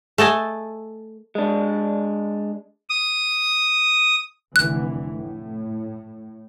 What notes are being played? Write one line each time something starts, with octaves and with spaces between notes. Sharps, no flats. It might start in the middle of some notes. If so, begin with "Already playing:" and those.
A3 A4 D#5 G#5
G#3 D4
D#6
F1 D3 E3 F#6
A2